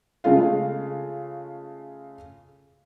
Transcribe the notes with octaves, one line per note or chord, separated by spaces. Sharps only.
C#3 G#3 A3 F4 F5